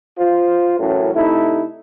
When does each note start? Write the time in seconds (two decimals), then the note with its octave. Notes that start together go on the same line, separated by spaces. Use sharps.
0.18 F4 C5
0.79 F#2 A2 E3 F#3 C#4
1.13 C3 A3 D#4 E4